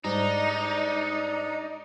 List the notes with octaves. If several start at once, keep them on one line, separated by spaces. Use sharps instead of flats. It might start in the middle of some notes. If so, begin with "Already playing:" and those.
G#2 G3 D4 D#4 D5